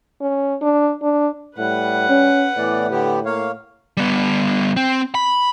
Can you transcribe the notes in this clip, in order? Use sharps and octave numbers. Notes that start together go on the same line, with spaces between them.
C#4
D4
D4
A2 G3 B4 F#5
C#4
A2 E3 B3 D5
D3 B3 G4
A#3 C#5 F5
G3 B3
C4
B5